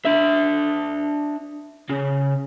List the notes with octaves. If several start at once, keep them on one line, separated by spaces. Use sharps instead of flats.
D4 E5
C#3